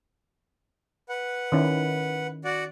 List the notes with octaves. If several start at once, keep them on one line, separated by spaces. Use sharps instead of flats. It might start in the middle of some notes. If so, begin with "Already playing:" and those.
B4 F#5
D#3 C#4 E4
F#4 D5 F#5